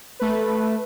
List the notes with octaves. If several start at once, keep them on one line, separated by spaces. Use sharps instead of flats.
A3 B4